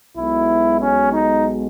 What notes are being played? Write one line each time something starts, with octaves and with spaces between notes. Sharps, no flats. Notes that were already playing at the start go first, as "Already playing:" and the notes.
B1 B2 G#3 E4
C#4
D#4